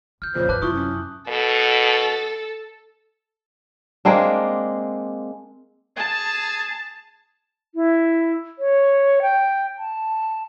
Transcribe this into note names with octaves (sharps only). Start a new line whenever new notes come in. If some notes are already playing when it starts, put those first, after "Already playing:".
C#2 F6 G6
F2 A#2 C#3 C5
G#2 B4 A5 D6 F#6
F#2 C3 E4 F4 C#6 D#6
C#4
B2 A4
G#3 A#3 C4 D4
G#4 A5
E4
C#5
G5
A5